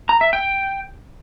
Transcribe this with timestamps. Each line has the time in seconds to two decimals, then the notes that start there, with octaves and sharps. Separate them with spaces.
0.09 A#5
0.21 E5
0.33 G5